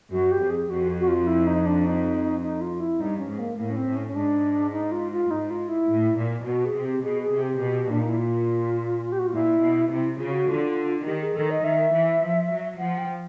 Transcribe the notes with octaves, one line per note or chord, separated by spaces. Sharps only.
F#2 F#4
G4
F2
G#4
F2 F#4
F#4
F4
E4
D#4
D4
D#4
D#4
F4
E4
G2 D#4
C#4
G#2
A#3
A2 A#3
C#4
C4
A2
C#4
C#4
G#2 D4
D#4
F4
F4
G#2 D#4
F4
E4
A2
A#2
B2 F#4
G#4
C3
G4
B2 G#4
G#4
C3
G4
B2
A#2 D4
D#4
E4
F4
G4
F#4
F4
A#2 E4
B2
C3 E4
C#3 F4
F#4
D3 F4
D#3 G4
G#4
D#3 A4
D#5
D#3 E5
E3
F3
F#3
F3 F#5
G5